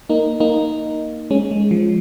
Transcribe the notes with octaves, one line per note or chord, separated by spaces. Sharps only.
A#3 D#4
A#3 D#4
G#3 C#4
G#3
F3